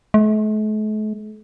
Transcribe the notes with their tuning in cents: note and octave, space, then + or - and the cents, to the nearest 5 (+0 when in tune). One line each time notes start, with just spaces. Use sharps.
A3 -45